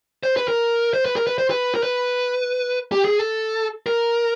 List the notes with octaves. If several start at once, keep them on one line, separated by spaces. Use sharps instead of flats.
C5
B4
A#4
C5
B4
A#4
B4
C5
B4
A#4
B4
G4
G#4
A4
A#4